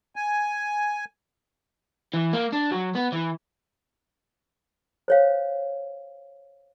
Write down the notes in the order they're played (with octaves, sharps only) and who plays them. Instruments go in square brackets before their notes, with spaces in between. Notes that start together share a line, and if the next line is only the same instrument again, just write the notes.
[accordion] G#5
[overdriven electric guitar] E3
A#3
D4
F#3
B3
E3
[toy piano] C5 C#5 F5